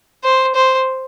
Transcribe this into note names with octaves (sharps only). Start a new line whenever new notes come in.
C5
C5